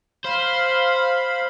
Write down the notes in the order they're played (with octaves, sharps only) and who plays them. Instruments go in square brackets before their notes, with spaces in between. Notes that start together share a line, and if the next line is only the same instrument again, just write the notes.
[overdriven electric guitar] C5 [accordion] F5 B5